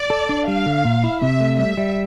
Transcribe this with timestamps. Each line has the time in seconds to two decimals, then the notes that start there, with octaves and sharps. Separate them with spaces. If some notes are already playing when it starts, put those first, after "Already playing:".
Already playing: D5
0.10 A4
0.29 D4
0.48 G3 F5
0.66 D3
0.85 A#2
1.04 E4
1.22 C3 E5
1.40 A3
1.58 G3 E5
1.77 G3